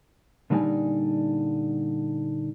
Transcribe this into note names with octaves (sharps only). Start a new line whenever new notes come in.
A#2 D3 G3 D#4 D5 G#5